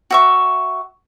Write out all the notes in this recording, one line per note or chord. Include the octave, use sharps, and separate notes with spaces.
F#4 E5 C#6